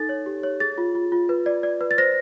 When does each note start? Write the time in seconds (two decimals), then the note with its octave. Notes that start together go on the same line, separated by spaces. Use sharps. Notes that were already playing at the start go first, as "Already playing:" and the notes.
Already playing: D#4 A4 A6
0.09 C#5
0.26 G4
0.43 C#5
0.60 G#4 A6
0.78 F4
0.95 F4
1.12 F4
1.29 B4
1.46 D5
1.63 D5
1.81 B4
1.91 A6
1.98 C5 A#6